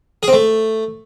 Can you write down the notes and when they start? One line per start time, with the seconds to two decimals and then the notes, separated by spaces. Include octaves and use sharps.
0.23 G#4
0.28 C4
0.33 A3